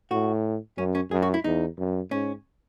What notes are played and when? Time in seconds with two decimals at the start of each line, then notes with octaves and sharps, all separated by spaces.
0.11 A2 F#4
0.78 F#2 C#4
0.95 C#4
1.11 F#2 G#4
1.22 F#4
1.34 E4
1.44 E2 D#4
1.78 F#2
2.11 G#2 C#4